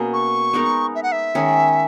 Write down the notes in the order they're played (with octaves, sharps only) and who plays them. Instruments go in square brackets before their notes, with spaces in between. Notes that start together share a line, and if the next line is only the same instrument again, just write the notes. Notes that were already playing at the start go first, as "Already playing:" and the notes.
Already playing: [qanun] B2 A#3 C#4 G#4
[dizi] C#6
[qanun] G#3 B3 D#4 A#4
[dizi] E5
F#5
E5
[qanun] D#3 G#3 C#4 G#4